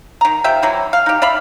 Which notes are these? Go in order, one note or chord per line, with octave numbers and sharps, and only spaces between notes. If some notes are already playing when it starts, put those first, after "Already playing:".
D#3 A#5
F3 G4 E5 G5
E3 F#3 E4
F5
D#4 G4
D5 E5 F5 B5